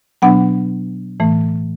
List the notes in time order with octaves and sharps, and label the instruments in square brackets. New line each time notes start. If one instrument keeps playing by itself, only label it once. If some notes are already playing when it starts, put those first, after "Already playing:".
[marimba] B2 F#3 B3 D4 F#5
A2 E3 A3